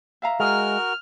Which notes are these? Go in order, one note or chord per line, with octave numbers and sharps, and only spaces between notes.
E5 F5 A#5
G#3 F#4 A#4 F6